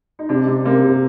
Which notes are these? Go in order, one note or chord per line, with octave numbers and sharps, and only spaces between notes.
D#4
C3 D4
C3
C3 A#3
C3